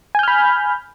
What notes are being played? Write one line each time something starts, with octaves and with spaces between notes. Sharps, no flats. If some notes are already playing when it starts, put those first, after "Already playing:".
G#5 B5 F6 G6